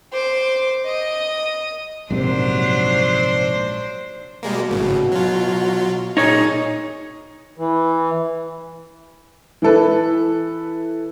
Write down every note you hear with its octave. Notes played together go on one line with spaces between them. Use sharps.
C5 D6
D#5 D#6
A#1 G#2 C3 F#3 D4 C5
B2 G3 G#3 A#3
G#1 A2 C#3
F#3 F4
A#2 D#4 G#4 C#5
E3
E3 E4 A4 B4